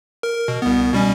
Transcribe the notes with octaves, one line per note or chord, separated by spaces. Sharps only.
A#4
B2
C2 B3
B2 G3 C#4